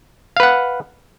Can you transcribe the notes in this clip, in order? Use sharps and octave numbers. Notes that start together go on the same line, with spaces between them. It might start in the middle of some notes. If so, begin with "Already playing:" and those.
B4 F5 F#5